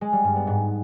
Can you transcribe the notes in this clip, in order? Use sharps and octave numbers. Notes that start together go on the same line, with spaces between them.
G#3
G3
G2
B3
G#2